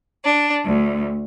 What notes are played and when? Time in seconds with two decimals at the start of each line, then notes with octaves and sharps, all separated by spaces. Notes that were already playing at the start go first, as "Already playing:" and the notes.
0.23 D4
0.65 D2